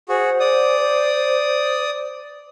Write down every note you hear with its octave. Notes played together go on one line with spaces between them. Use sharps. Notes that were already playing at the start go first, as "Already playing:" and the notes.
F#4 G#4 C5
D5 D#6